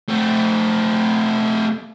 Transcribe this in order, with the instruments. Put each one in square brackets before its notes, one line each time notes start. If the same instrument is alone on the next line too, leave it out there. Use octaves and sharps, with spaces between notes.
[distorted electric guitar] A3 C4